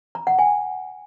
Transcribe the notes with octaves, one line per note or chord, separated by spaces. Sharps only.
A#5
F#5
G#5